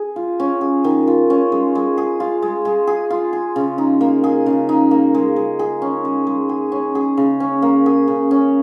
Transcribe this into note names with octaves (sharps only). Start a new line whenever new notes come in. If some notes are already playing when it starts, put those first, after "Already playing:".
Already playing: G#4
F4
C#4
G#4
D#3
F4
C#4
G#3
G#3
G#4
F4
G#3
G#3
G#4
F4
G#4
C#3
D#4
A#3
G#4
C#3
D#4
A#3
G#3
G#3
G#4
C#4
G#3
G#3
G#4
C#4
G#4
C#3
C#4
A#3
G#4
C#3
C#4